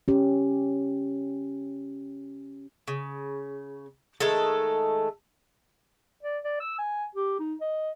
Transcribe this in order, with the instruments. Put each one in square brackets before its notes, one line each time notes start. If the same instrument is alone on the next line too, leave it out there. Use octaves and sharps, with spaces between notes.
[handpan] C#4 G4
[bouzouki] C#3
D#3 G#3 A3 A4
[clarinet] D5
D5
E6
G#5
G4
D#4
D#5